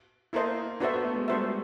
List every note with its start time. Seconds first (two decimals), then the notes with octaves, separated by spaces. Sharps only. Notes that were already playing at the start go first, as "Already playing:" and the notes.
0.33 A#3 E4 A4 C5 D#5
0.80 B3 D4 F#4 A4 C5 E5
0.93 B3
1.04 A3
1.16 G#3
1.28 G3 D4 F#4 A4 C5 E5